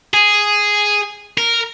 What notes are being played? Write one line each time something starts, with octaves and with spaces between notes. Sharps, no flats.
G#4
A#4